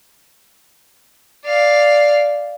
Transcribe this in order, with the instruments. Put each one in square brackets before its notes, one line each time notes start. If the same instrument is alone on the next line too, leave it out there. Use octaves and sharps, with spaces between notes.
[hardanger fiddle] D5 F5